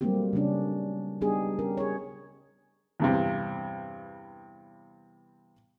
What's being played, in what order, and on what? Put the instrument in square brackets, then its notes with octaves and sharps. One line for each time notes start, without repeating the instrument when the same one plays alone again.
[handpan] F#3 G3 A3 A#3 C4 G4
C#3 A3 C#4 D4
G3 B3 D4 D#4 G4 G#4
C#4 G4 A#4
G#4 C#5
[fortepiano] E2 G2 C3